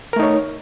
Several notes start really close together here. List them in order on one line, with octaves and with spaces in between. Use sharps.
A#4 A3 D#4 C#5